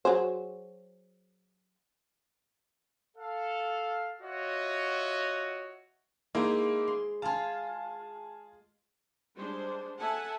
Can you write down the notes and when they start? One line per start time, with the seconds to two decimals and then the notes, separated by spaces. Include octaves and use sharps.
0.05 F#3 G#4 C5
3.17 A4 F5
4.22 F4 F#4 C#5 D#5 E5 F#5
6.35 G#3 A#3 D#4 E4 C5
6.87 C6
7.22 F4 G#4 F5 A5
9.36 G3 G#3 D4 C5
9.99 A4 E5 F#5 G#5 A5